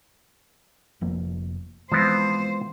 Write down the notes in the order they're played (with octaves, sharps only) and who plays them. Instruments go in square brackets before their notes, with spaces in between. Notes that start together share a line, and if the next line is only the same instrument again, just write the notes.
[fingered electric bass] F1 F3 A#3
[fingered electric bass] E3 G#3 [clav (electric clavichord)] F3 B3 C4 [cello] C5